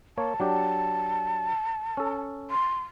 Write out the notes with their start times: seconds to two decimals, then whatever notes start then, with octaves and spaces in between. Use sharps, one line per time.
0.18 A#3 C#5 A5
0.40 F#3 D4 G4
1.97 C#4 A4
2.50 C6